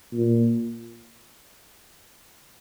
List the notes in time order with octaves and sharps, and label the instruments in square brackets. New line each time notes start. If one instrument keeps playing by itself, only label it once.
[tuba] A#2